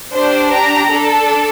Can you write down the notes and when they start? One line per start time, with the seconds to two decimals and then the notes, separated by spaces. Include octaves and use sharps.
0.14 D4 G4 C5
0.54 A#5
0.93 D4 A4